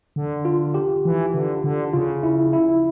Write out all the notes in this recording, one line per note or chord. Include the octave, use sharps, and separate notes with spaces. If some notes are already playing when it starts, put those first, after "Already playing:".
D3
F4
G4
E3
D3
D3
C#3 F4
E4
E4